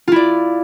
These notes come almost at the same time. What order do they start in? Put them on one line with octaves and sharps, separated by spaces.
F4 E4 D5